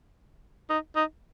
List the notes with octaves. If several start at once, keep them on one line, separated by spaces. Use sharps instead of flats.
D#4
D#4